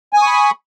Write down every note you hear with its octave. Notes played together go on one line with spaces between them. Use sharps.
G#5 B5 C#6 D#6